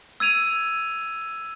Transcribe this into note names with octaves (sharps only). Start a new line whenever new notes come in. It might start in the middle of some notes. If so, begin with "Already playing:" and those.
E6 G#6 D#7 F7